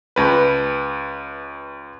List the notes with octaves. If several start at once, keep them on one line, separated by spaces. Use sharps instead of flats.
C#2 B4